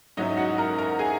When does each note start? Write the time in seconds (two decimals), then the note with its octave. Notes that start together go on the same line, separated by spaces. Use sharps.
0.17 G#2 F#3 C#4 D#4 E4 D#5
0.37 F#4 F#5
0.58 A#4 A#5
0.78 A#4 A#5
0.99 G#4 G#5